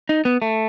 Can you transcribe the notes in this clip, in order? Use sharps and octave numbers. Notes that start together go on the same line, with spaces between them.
D#4
B3
A3